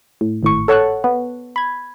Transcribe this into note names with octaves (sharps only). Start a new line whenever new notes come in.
A2
G#1 A2 C#6
A4 C#5 F#5 A5 C#6 F#6
B3
B5 G#6